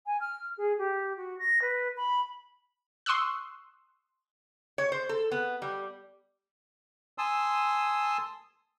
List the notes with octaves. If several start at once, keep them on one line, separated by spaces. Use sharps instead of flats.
G#5
F6
G#4
G4
F#4
A#6
B4
B5
C6 C#6 D#6 E6 F#6
C#5
C5
A4
B3
G3
G#5 A5 C6 D#6 E6